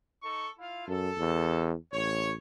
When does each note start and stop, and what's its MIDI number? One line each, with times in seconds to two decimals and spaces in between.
0.23 0.47 63
0.23 0.47 69
0.23 0.47 85
0.58 0.85 64
0.58 0.85 65
0.58 0.85 77
0.88 1.11 42
0.88 1.67 69
1.18 1.75 40
1.93 2.36 33
1.93 2.31 73